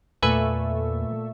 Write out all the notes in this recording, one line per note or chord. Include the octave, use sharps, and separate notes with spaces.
E2 A#2 A3 B4 E5 G#5